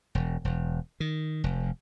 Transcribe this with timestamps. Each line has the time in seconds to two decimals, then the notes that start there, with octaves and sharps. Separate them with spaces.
0.15 E1
0.45 E1
1.00 D#3
1.44 F1